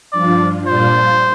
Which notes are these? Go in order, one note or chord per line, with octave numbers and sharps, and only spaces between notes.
G2 F3 D4 F4 D5
A#2 G3 D4 F4 C5